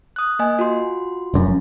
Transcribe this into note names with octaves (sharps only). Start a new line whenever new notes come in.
D#6 F#6
A#3 D#5 G#5
F4 F#4 C6
F1 F#2